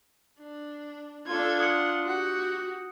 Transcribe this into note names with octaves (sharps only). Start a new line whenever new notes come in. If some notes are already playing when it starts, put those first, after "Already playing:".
D4
D4 F4 A4 G#6
F#5 D#6 C#7
F#4 G4 F#5